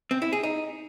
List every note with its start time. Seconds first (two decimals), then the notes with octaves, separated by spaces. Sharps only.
0.11 C4
0.22 E4
0.33 G#4
0.43 D#4